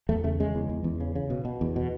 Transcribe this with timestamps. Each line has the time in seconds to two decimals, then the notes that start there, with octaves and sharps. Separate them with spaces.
0.09 E2 A3
0.24 C#3 A3
0.40 C#3 G#3
0.55 E2
0.69 E2
0.84 E2
1.00 C#3
1.15 C#3
1.30 B2
1.45 B2
1.61 E2
1.76 B2